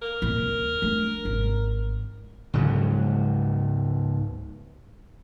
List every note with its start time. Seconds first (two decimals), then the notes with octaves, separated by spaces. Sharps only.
0.02 A#4
0.22 D#2 A#2
0.40 D#2
0.82 A3 D4
1.25 G#1
2.54 C#2 G#2 F#3